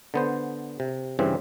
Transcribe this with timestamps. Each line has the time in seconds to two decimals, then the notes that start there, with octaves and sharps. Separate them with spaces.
0.14 D3 B3 C5
0.80 C3
1.19 G2 C#3 E3 C4